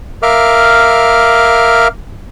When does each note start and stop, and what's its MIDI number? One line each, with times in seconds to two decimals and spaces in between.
0.23 1.88 70
0.23 1.88 76
0.23 1.88 77
0.23 1.88 86
0.23 1.88 89